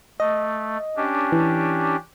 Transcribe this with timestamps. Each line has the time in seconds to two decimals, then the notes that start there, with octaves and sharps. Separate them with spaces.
0.20 A3 D#5
0.97 C#4 D4 G4
1.32 E3